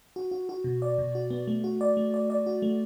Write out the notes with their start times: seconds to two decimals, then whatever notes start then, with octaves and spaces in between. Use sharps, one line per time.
0.16 F#4
0.31 F#4
0.49 F#4
0.64 B2
0.82 D5
0.98 B2
1.15 F#4
1.30 B3
1.47 A3
1.64 F#4
1.81 D5
1.97 A3
2.14 D5
2.30 D5
2.46 F#4
2.62 A3